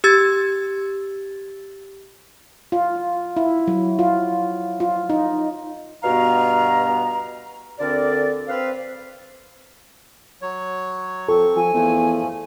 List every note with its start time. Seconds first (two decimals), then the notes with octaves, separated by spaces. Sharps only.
0.04 G4 E6 G#6 A6
2.72 F4
3.37 E4
3.67 F#3
3.99 F4
4.80 F4
5.10 D#4
6.03 G2 B2 B3 F#4 F5 A#5
7.79 D2 D3 C4 A#4 D5
8.49 C4 B4 F5
10.42 F#3 C#5
11.29 F3 C4 A4 C#6
11.56 F3 G#5
11.74 E2 F3 A3